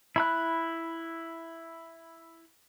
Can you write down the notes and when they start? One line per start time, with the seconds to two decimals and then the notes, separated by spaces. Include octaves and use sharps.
0.16 E4 B5 F#6